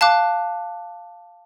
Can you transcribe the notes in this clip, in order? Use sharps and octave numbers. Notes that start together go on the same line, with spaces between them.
F5 A5 D6 F#6